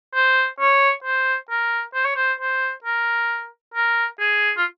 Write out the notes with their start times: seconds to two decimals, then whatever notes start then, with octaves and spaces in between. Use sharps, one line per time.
0.15 C5
0.60 C#5
1.04 C5
1.50 A#4
1.94 C5
2.05 C#5
2.16 C5
2.40 C5
2.84 A#4
3.74 A#4
4.20 G#4
4.57 F4